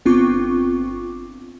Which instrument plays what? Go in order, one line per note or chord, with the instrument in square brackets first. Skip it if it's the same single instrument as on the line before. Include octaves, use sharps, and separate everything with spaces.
[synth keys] G1 B3 C4 F4 C#6 D6